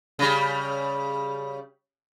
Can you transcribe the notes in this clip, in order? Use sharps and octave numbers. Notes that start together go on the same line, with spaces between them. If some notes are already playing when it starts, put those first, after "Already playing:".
C#3 G3